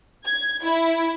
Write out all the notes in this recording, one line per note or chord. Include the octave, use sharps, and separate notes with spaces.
G#6
E4